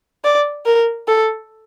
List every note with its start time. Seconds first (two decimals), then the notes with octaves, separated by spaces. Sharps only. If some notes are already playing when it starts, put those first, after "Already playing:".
0.24 D5
0.66 A#4
1.08 A4